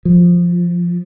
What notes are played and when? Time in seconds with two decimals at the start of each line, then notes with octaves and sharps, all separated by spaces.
0.05 F3